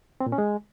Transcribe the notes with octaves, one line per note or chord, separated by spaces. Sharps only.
C4
A#2
C#4
G#3